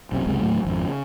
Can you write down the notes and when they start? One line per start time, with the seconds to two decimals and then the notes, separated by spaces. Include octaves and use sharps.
0.12 B1 F#2 C3
0.26 F#1 C#2 C3 G#3
0.40 D#2 A2 F#3 A3
0.65 G#1 F2
0.85 C#3